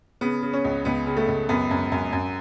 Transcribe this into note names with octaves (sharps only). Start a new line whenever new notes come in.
C#3 B3
C#3
C#4
C#2
C#2 B3
C#3
A3
C#2
F#2 B3
F#2
F#2
F#2